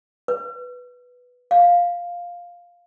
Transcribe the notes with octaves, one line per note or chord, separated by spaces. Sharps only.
B4
F5